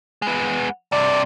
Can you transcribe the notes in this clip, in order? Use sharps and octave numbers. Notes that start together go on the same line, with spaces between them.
G#3 B3
G2 C3 D5